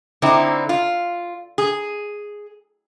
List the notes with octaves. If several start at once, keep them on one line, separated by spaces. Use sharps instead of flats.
D3 C4 D#4 E4
F4
G#4